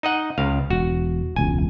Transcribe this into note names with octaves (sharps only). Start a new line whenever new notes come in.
D#4 D#5 F#5
C#2 F5
E1 F#4
E1 C#2 G#5